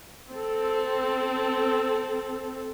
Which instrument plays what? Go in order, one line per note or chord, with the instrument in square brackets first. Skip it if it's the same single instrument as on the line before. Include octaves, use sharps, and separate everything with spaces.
[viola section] C4 A4